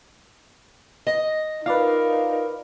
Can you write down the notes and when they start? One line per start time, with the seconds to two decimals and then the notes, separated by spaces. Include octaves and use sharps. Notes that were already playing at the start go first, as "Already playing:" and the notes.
1.07 D#5
1.66 D#4 F4 A#4 B4 D5 F5